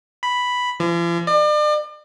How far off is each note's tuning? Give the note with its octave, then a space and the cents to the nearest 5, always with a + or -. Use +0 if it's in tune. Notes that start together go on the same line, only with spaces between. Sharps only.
B5 +0
F3 -45
D5 +40